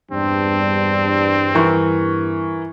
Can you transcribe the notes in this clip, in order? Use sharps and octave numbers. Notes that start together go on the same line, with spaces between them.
E2 G2 G3 C4 D4
E3 A#4 C#6